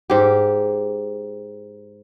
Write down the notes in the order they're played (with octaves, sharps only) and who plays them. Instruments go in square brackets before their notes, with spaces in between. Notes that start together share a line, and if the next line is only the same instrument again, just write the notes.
[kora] G#2 G4